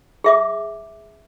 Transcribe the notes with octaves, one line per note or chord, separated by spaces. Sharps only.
G#4 E5 D6